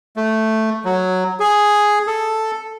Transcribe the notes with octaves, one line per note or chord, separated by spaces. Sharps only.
A3
F#3
G#4
A4